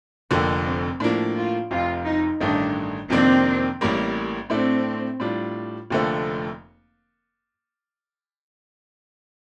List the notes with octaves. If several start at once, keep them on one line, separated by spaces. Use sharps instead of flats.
F1 F2 D3 A#3
C4
A2 F3 A#3 D4
F4
F1 F2 C3 F4
D#4
A1 G2 D#3 A3 D4 D#4
F2 C3 D#3 A#3 C4 D4
A1 A2 G3 A#3
A2 A3 C4 D4
A2 G3 D4 F4
F1 F2 D3 F3 A3 A#3